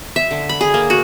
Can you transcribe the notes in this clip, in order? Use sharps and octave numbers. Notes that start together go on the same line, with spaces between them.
E5
D3
B5
G#4
A#3
F#4